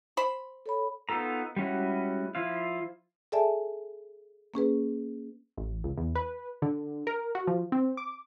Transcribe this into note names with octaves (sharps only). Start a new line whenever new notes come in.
C5 B5
A4 C#5 B5
B3 D#4 F4 A4 A#5
G3 G#3 C#4 E4 F#4
F3 E4 F4 F5
G#4 A4 D5 E5 G#5 A5
A#3 C#4 G#4 B4
A1
C#2
E2
B4
D3
A#4
F#4
F3
C4
D6